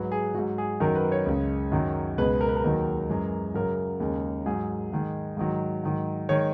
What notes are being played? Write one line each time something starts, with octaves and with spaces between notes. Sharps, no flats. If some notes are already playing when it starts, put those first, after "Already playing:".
Already playing: G#2 F#3 B4
G#4
G#2 F#3 F#4
G#4
F#2 D#3 F#3 A#4
B4
C#5
C#2 C#3 G#3
F#2 D#3 F#3
C#2 B2 G#3 B4
A#4
B4
A#4
D#2 D#3 F#3
F#2 E3 G#3
F#2 C#3 F#3 A#4
D#2 C#3 G#3
G#2 F#3 G#4
G#2 D#3 G#3
G#2 D#3 F#3
G#2 D#3 F#3
D#3 G#3 C#5